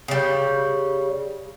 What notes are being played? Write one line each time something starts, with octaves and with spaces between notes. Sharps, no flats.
C#3 G3